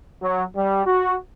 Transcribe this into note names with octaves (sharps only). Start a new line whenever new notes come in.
F#3
G3
F#4